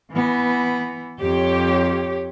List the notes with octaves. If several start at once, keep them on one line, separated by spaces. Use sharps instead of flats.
E3 B3
F2 G4 C#5